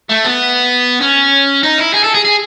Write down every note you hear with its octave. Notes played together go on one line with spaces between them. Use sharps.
A3
B3
C#4
D#4
E4
G#4
A4
G#4
G#4